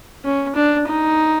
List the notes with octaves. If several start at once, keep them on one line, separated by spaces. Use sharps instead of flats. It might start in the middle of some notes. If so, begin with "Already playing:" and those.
C#4
D4
D#4